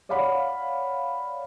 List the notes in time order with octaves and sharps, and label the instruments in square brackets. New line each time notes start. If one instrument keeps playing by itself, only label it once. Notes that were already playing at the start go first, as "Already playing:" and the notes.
[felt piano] C#5 D5 F5 F#5 B5